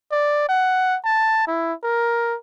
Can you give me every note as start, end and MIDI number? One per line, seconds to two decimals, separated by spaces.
0.12 0.45 74
0.49 0.97 78
1.05 1.45 81
1.47 1.73 64
1.83 2.36 70